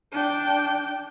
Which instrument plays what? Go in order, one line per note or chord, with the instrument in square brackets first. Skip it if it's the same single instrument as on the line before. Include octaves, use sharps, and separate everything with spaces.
[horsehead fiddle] D4 G5